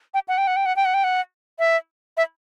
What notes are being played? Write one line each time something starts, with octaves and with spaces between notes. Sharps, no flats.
G5
F#5
G5
F#5
G5
F#5
G5
F#5
G5
F#5
E5
E5